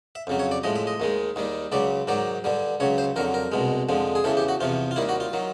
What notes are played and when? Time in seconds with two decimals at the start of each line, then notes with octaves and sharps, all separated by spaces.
0.15 E5
0.27 F2 C#3 F#3
0.39 C#5
0.51 D5
0.63 A2 F3 G#3 D#5
0.76 E5
0.87 D#5
1.00 D#2 D#3 G#3
1.36 D#2 D#3 G3
1.72 C#2 C#3 F#3 D5
2.07 G#2 D#3 F#3 D5
2.44 G2 D3 G3
2.80 C#2 C#3 F#3 C#5
2.98 C5
3.16 F2 D3 F#3 A#4
3.34 A#4
3.52 C2 B2 G#3
3.89 F2 D3 F3 G#3
4.15 G#4
4.24 E2 C#3 E3 A4
4.37 G4
4.48 F#4
4.61 E2 C3 F3 F4
4.91 F4
4.96 D#2 D#3 G3 E4
5.09 F#4
5.20 F4
5.33 D#3 F#3